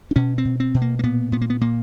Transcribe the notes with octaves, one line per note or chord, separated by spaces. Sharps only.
D4
B2 C#4
C4
B2
C4
B2
A#3
A#3
A#2 B3
A#2 B3
A#3
B3
A#2 A#3